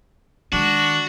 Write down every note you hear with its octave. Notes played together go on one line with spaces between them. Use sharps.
D#3 G#3 D4 F#4